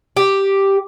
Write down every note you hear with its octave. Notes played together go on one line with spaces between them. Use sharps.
G4